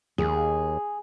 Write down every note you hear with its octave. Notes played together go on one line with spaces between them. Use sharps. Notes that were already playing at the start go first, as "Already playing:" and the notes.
D#2 G#4